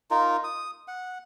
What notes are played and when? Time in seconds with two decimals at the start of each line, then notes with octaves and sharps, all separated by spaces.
0.11 D#4 F4 A#4
0.44 D#6
0.88 F#5